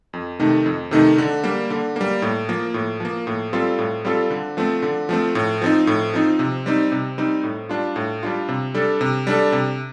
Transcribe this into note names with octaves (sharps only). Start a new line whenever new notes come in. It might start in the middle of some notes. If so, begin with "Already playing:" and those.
F2
C3 D#3 A3 D#4
F2
C3 D#3 A3 D#4
D3
G3 A#3
D3
G3 A#3
A2
F3 A#3
A2
F3 A#3
A2
G3 C4 F4 A4
A2
G3 C4 F4 A4
D3
F3 A3 C4
D3
F3 A3 C4
A2
F3 C4 D#4
A2
F3 C4 D#4
C3
G3 C4 D#4
C3
G3 C4 D#4
A2
G3 D4 F4
A2
G3 D4 F4
C3
G3 D4 A4
C3
G3 D4 A4
C3